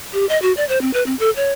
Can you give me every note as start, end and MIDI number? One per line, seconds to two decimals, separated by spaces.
0.13 0.26 67
0.29 0.40 75
0.42 0.53 66
0.57 0.65 74
0.69 0.81 72
0.81 0.91 60
0.93 1.03 71
1.06 1.15 60
1.19 1.30 69
1.36 1.52 73